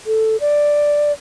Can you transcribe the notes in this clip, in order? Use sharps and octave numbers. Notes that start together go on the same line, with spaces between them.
A4
D5